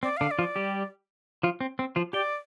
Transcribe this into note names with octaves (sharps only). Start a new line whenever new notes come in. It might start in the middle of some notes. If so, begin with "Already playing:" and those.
C4 D5
D3 D4 F5
D5
F3 F4
G3 G4
F3 F4
C4
C4
F3 F4
G4 D5 G5